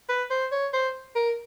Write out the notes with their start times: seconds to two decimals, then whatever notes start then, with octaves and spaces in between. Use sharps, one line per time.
0.09 B4
0.30 C5
0.52 C#5
0.73 C5
1.15 A#4